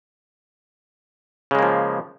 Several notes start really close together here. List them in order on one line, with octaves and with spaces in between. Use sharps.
C#3 G#3 A#3 F3